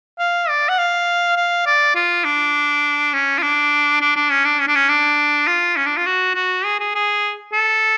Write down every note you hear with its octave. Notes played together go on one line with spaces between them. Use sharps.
F5
D5
F#5
F5
F5
D5
F4
D4
C#4
F4
D4
D4
D4
C#4
D4
C#4
D4
C#4
D4
F4
C#4
D4
F4
F#4
F#4
G#4
G#4
G#4
A4